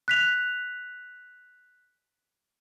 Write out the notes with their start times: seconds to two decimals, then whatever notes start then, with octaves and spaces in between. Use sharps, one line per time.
0.08 F#6 B6 F7